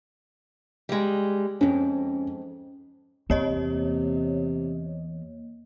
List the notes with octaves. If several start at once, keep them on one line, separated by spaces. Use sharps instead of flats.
G3 G#3
F2 G#2 C#4
E2 C3 A#3 C#5 D#5